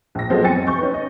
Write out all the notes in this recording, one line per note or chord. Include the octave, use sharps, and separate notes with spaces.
A#1 A#6
F3 F#3 G#3 B3 A4 D#5
F#1 C4 G5 G#5 A6 C#7
C3 C#6 G6
C#4 D#4 B4
D#5